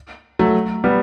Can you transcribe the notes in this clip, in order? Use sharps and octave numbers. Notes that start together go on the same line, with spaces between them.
F#3 A3
G3 B3